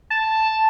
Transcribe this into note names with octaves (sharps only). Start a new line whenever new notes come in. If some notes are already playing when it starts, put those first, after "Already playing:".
A5